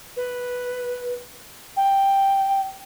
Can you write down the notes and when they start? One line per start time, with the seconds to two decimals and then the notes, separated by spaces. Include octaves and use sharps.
0.16 B4
1.76 G5